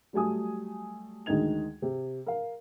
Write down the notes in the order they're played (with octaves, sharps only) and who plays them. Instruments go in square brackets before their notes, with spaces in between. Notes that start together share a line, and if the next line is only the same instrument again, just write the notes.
[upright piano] F#3 G3 A3 G#5 D#6
D2 D#3 G#3 D#4 G#6 F7
C3
A#4 F5